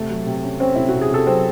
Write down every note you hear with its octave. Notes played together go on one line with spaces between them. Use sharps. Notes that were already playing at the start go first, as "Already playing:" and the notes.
Already playing: C3 A3 A4
F#3
C3
C#4
C4 C#4 C5
C3 E4
C3 F#4
G#4
C3 A4
F#3 C4 C5